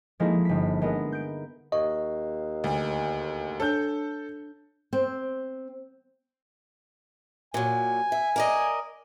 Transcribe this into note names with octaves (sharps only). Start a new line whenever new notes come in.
F3 G#3 A#3 D#4 E4 A4
G1 B6
G#3 B3 A#4
G6 D7
D#2 D#5 C#6
D2 E5
D4 A4 C#5 G6
C4
A#2 F#3 G#5
E5
A#4 D5 D#5